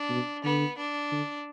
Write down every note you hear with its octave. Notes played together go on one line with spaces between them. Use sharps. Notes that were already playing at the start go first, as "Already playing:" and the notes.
Already playing: D4
B2
D3 B3
D4
D3